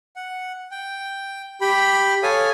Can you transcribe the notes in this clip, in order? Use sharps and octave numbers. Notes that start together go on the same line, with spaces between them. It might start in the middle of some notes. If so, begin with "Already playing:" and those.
F#5
G5
G4 G5 B5
A4 C#5 F5 G#5 D#6